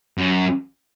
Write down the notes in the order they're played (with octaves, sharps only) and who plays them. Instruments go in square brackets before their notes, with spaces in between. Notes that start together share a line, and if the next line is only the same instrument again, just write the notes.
[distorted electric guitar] F#2